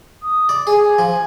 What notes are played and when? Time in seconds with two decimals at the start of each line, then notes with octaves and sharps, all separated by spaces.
0.22 D#6
0.49 D5
0.67 G#4 G#5
0.99 F3